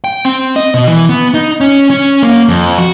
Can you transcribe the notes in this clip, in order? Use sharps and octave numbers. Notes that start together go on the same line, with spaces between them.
G5
C4
D#5
B2
E3
B3
D#4
C#4
C#4
A#3
F2
F#4